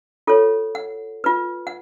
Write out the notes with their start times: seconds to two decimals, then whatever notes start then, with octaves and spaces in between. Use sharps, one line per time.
0.27 F4 A4 C#5
0.75 F#5
1.24 F4 B4
1.67 F#5